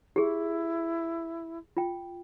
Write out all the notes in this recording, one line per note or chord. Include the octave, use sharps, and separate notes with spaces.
E4 G4 G#4
F4 G5